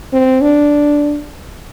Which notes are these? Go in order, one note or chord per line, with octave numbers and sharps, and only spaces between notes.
C4
D4